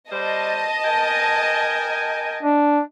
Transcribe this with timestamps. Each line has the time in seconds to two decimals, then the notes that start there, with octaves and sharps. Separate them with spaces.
0.11 G3 C5 D#5 A5
0.84 A#4 G5 G#5
2.43 D4